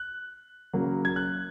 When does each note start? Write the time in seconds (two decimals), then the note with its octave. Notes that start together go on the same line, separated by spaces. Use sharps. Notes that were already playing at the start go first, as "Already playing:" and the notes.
Already playing: F#6
0.73 C#3 F#3 A#3
1.05 G#6
1.16 F#6